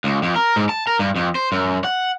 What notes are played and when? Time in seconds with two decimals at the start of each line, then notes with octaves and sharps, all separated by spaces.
0.04 C#2
0.23 F2
0.36 A#4
0.56 G#2
0.69 A5
0.87 A#4
0.99 G2
1.16 F2
1.35 C5
1.52 F#2
1.84 F#5